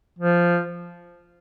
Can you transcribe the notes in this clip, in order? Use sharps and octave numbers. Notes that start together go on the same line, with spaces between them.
F3